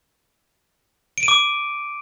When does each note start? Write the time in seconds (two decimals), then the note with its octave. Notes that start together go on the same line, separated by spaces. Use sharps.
1.18 D7
1.23 D#7
1.28 D6